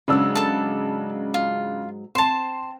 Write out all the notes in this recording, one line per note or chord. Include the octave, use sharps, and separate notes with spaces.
G#2 C#3 F#3 G#3 D4 E6
A4 A5
F4
C4 C5 A5 C6 E7